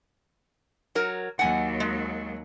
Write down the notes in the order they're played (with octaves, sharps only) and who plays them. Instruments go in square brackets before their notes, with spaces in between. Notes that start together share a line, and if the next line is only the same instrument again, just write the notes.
[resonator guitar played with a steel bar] F#3 A#4
[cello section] D#2 F#3 [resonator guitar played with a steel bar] F#5 G#5
[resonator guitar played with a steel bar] G#3